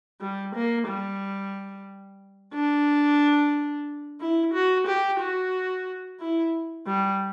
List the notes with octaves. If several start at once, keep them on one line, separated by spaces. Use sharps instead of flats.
G3
A#3
G3
D4
E4
F#4
G4
F#4
E4
G3